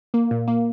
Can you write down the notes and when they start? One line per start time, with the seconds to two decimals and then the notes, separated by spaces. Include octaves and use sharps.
0.14 A#3
0.31 A#2
0.48 A#3